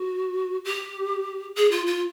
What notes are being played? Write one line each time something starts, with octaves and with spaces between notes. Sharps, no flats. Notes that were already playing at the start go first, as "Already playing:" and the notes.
Already playing: F#4
G4
G#4
F4
F4